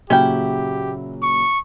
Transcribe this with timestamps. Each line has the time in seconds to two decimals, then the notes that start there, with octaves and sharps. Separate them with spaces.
0.10 A#2 C#3 F#3 C#4 E4 G4 G5
1.22 C#6